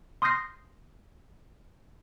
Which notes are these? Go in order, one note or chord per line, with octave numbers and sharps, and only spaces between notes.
C6 D#6 F6 G6 A#6 C7